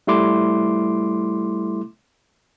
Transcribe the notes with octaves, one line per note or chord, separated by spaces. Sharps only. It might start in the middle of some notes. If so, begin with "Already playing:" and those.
G3 A3 E4 C6 D6